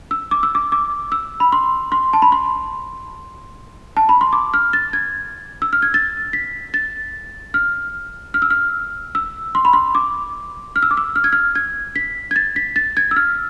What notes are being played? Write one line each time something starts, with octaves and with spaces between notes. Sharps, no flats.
E6
D6
E6
D6
D6
E6
B5
C6
C6
A5
B5
C6
A5
B5
C6
D6
F6
A6
G#6
E6
F6
G#6
A6
B6
A6
F6
F6
E6
F6
E6
C6
B5
C6
D6
F6
E6
D6
E6
F6
G#6
F6
G#6
B6
G#6
A6
B6
A6
G#6
E6
F6